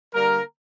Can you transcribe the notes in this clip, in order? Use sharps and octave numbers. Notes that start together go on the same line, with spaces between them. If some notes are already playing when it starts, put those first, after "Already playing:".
D3 G3 A#3 A#4